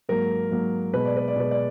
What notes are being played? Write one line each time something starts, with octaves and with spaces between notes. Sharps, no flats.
G#2 F#3 A#3 A#4
G#2 F#3 A#3
B2 G#3 B4
D5
B4
D5
B2 G#3 B4
D5